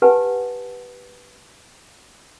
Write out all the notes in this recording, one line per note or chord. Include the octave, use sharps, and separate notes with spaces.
G4 B4 F#5 G#5 A5